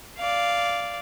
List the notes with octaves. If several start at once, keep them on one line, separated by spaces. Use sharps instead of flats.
D5 F5